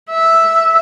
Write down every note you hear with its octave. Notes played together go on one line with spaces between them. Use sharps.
E5